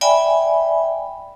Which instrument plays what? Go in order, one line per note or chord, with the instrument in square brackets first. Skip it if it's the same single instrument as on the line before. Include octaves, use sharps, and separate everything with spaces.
[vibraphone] D5 E5 G5 G#5 B5